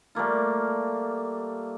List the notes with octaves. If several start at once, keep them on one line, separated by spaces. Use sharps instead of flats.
G3 A3 A#3 F4